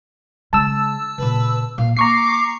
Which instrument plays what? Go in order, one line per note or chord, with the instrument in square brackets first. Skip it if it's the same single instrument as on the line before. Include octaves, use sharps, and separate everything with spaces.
[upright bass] C#3 G#3 [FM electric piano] A5 E6
[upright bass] A#2 C#3 [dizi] B4
[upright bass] A#2 [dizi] F5
[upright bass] A#3 [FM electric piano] A#5 C#6 C7 [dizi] D6